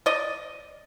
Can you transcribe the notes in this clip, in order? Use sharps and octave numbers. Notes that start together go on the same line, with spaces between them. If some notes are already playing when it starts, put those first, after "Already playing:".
D5 D#5